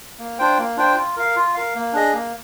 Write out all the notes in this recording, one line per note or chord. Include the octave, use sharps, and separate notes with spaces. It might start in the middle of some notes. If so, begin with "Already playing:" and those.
A#3
D4 F4 C5 G5
A#3
D4 F4 C5 G5
F4
A#4 F5
F4
A#4 F5
A#3
D4 G#4 D#5
A#3